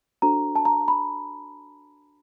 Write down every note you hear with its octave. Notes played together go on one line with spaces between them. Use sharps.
D4 F#4 A4 C5 A#5
A5
A#5
B5